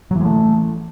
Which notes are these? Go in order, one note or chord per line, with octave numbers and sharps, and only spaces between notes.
E3 F#3 G#3 A3